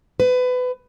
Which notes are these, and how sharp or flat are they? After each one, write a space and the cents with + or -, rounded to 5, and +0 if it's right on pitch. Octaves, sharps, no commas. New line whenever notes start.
B4 +25